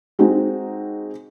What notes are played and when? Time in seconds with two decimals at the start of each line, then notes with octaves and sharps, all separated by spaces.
0.19 G#3 C4 D#4 F#4